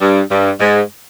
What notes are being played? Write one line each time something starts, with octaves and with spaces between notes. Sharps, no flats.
G2
G2
G#2